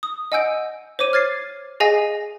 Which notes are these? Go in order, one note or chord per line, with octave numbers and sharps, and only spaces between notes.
D#6
D#5 F#5 G#5 E6 G6 D7
C5 C#5 D6 D#7
F6 G#6 A6 C7
G#4 D#5 F5 G#5 A#6